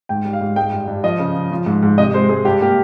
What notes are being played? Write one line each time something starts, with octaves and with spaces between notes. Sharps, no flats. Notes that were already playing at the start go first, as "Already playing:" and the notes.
G#2 G5
G3
F5
G#2
G#3 G5
G2
G2
F3 D#5
C#3
F3
F3
G#2
G#2
C3 D#5
G#3 C5
G#3 G#4
G2 G4
A#3 G4